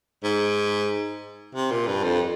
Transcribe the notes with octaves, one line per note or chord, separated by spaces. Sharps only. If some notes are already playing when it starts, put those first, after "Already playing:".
G#2
C3
A#2
G2
F2